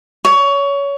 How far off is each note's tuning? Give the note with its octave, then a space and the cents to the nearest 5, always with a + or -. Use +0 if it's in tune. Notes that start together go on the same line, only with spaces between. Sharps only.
C#5 +20